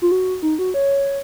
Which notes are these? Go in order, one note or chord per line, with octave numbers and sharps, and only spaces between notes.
F4
F#4
D#4
F#4
C#5